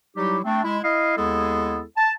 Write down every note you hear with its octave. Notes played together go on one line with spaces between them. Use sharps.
F#3 G3 D#4 E4 G4
A3 C4 D4
G#3 E4
E4 D#5 F5
D#2 G#3 B3 E4 G#4 A4
A5